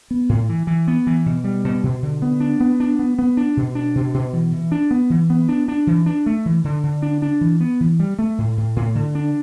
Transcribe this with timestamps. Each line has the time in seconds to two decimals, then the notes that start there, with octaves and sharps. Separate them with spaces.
0.11 B3
0.29 A2
0.49 E3
0.67 E3
0.88 B3
1.07 E3
1.26 B2
1.44 G3
1.65 B2
1.84 B2
2.03 D3
2.22 B3
2.40 D4
2.61 B3
2.80 D4
2.99 B3
3.19 B3
3.37 D4
3.57 B2
3.75 D4
3.95 B2
4.14 B2
4.33 E3
4.52 E3
4.72 D4
4.91 B3
5.10 E3
5.30 B3
5.49 D4
5.68 D4
5.87 E3
6.06 D4
6.26 A3
6.45 E3
6.64 D3
6.84 D3
7.02 D4
7.22 D4
7.41 E3
7.60 B3
7.80 E3
8.00 G3
8.19 A3
8.38 A2
8.58 A2
8.76 A2
8.95 D3
9.15 D4